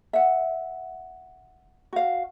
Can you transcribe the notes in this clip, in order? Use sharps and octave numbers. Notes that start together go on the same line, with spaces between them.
E5 F#5
F#4 F5